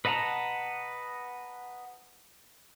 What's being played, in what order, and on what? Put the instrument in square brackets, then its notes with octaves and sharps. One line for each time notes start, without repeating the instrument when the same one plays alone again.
[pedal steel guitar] B4 D#5 F#5 A5 A#5